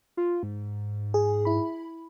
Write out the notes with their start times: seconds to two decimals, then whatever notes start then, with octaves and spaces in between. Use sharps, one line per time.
0.17 F4
0.43 G#2
1.14 G#4
1.45 E4 B5